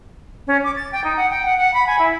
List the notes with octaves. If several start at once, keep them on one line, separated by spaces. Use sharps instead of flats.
C#4
D6
A6
G5
D#4
F#5
G5
F#5
F#5
B5
G#5
E4